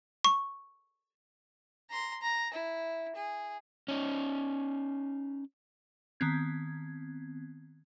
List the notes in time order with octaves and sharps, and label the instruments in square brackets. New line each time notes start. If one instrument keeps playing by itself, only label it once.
[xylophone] C#6
[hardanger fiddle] A#5 C6
A#5
E4
G#4
[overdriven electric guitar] C#4 D#4
[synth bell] D#3 B3 C4 G#6